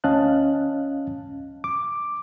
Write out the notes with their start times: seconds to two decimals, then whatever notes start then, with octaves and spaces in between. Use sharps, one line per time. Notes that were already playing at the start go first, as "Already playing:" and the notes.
0.04 D2 C#4 D#5 F5 A5 F#6
1.64 D6